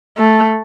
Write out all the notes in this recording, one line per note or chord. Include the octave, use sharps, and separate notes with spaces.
A3